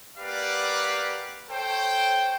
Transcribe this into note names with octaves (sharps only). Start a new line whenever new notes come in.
A#3 G4 B4 D5 F5 F#5
A4 C5 C#5 G5